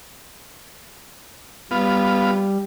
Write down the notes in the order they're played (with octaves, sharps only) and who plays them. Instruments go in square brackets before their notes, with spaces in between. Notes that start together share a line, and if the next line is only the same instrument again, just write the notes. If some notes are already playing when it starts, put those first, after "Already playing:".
[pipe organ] G3 [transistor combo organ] B3 F4